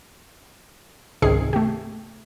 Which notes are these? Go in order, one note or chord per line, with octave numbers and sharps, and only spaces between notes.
G#1 C#2 C3 D#3 G#4 C7
A3 G4